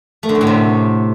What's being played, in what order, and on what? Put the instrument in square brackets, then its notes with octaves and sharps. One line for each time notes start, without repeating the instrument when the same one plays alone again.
[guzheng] A3
D3
F#2
A2
C3